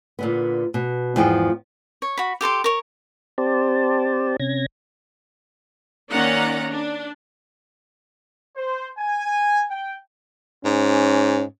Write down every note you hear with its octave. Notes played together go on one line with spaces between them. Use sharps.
A#2 D3 B3
B2
E2 G#2 F3 G5
C#5
F#4 B5
G4 A4 C6 D6
A#4 C#5
C4 G4 C5 D5 A5
C3 C#4 G#6 A#6
D#3 A#3 C#4 D5 F#5 A#5
D4
C5
G#5
G5
G#2 C#4